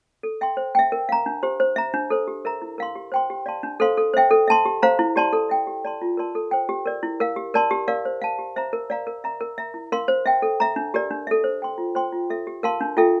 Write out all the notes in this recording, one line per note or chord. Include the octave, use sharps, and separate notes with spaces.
A4
E5 G5 C6
C5
E5 G5
A#4
F5 A#5
D4
G4 C5
C5
E5 A#5
D4
A4 C5
G4
A#4 E5 A#5
E4
A#4 F5 C6
G4
C5 G5 C6
G4
D5 F5 A5 C6
D4
A4 C5 F5 C6
A4
C5 E5 G5
A4
E5 A5 C6
G4
C5 F5 A#5
E4
G4 D5 A5 C6
A4
E5 G5
G4
D5 A5 C6
F4
A#4 D5 A5 C6
A4
C5 G5
G4
A#4 D5
E4
A#4 F5
G4
A#4 D5 A5 C6
G4
A#4 D5 F5
C5
F5 A5
G4
C5 E5 A#5
A#4
D5 F5 A#5
A#4
E5 A#5
A#4
E5 A#5
E4
A#4 F5 C6
C5
E5 G5
A4
E5 A#5
D4
G4 A#4 D5
D4
A4 E5
C5
G5 C6
F4
C5 G5 C6
F4
A4 E5
G4
A#4 F5 A5 C6
D4
F4 A4 E5 G5